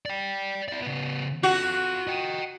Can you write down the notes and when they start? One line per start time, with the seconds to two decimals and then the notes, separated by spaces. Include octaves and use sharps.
0.06 D5 G5
0.68 E4 D5
0.82 C#3 B3
1.43 F4 F#4 A4
2.08 D#5 G5